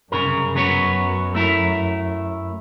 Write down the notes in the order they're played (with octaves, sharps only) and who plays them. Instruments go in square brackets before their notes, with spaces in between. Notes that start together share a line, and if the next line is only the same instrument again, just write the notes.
[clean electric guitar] C2 C#3 A#4 [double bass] F#2
[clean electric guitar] F#3 B3 C#5
A3 E4 A#4